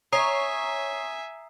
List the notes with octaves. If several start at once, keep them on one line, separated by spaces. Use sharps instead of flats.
C#5 E5 G#5 A#5 D#6 C7